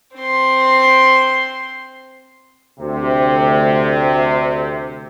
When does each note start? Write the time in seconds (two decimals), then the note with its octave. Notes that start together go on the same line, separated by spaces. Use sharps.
0.15 C4 C6
2.80 D2 C3